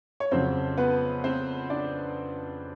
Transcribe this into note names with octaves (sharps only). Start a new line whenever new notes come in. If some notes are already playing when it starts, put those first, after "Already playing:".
C#5
F2 C#3 F#3 C4 C5
B3 B4
C4 C5
D4 D5